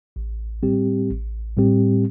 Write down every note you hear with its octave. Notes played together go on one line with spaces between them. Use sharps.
A1
A2 G3 C4 G4
A1
A2 G3 C4 G4